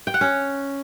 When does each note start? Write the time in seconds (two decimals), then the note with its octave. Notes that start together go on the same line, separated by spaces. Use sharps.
0.07 G5
0.14 F#5
0.21 C#4